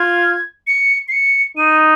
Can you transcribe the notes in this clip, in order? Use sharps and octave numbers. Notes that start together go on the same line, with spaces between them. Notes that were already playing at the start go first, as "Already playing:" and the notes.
Already playing: F4 G#6
C#7
C7
C#7
D#4 D#7